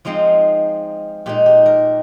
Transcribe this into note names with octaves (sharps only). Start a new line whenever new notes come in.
F3 G#3 C4 D#4 F4
A#2 G#3 D#4 G4
G4
A#4